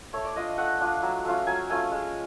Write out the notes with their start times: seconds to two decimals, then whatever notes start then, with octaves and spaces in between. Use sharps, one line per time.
0.13 A3 C#5
0.25 D5
0.36 D4 F4 D#5
0.58 A3 F#5
0.80 D4 F4
1.02 F#3
1.25 A3 C#4 F4
1.47 F#3 G#5
1.70 A3 C#4 F4 G#5
1.91 G#3